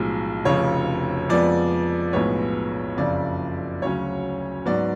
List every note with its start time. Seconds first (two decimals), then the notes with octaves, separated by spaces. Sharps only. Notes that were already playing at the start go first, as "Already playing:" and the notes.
Already playing: B1 A2 F3 G#3
0.45 F1 F2 C#3 F3 C#5
1.29 F2 F3 G#3 B3 D5
2.13 B1 A2 F3 G#3 B3 C#5
2.97 F#1 F2 C#3 D5
3.82 D2 C#3 F#3 C#4 C#5
4.65 G#2 F#3 B3 D5